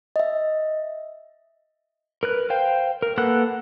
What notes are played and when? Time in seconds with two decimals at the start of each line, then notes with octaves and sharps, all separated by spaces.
0.16 D#5 E5
2.23 A#4 B4 F#6
2.50 C5 F5 G5
3.02 A#4
3.18 A#3 A4 B4 F#5 F#6